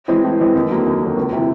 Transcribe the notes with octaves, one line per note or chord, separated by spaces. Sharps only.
E3 G#3 C4
A2
E3 G#3 C4
D#2
D3 F#3 A#3
D#2
D3 F#3 A#3
C#2
C3 E3